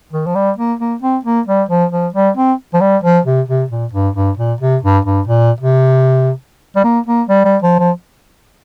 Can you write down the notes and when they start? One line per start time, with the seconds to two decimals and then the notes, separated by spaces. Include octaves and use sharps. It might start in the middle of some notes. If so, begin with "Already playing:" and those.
0.13 D#3
0.26 F3
0.35 G3
0.58 A#3
0.79 A#3
1.02 C4
1.25 A#3
1.47 G3
1.69 F3
1.92 F3
2.14 G3
2.37 C4
2.74 F3
2.81 G3
3.04 F3
3.25 C3
3.48 C3
3.70 A#2
3.93 G2
4.16 G2
4.37 A#2
4.61 C3
4.83 G2
5.05 G2
5.27 A#2
5.60 C3
6.76 G3
6.84 A#3
7.06 A#3
7.29 G3
7.45 G3
7.62 F3
7.79 F3